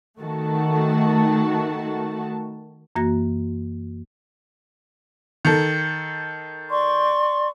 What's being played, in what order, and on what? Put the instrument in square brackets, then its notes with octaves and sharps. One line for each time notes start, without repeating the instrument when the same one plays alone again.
[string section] D#3 A3 F#4 A5
[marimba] F#2 E3 A#3 F#4 A#5 A#6
[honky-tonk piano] D#3 A4
[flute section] D5 C6 C#6